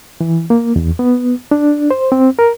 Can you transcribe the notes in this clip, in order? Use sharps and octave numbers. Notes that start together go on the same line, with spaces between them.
E3
A#3
E2
B3
D4
C5
C4
A#4